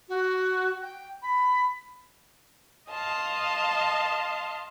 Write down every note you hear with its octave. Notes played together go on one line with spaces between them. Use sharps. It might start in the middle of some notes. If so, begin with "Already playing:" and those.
F#4
G5
B5
D#5 F5 A5 C6